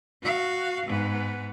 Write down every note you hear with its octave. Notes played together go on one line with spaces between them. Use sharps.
F#4 F5
G#2 B3